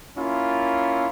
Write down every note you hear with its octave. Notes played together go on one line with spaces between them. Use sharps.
A#3 C#4 E4 F4